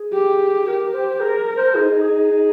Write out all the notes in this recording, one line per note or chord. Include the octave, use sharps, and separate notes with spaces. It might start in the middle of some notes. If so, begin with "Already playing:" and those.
Already playing: G#4
G4
G4 A#4
A#4
C5
G#4 A#4
C5
D#4 G#4
G#4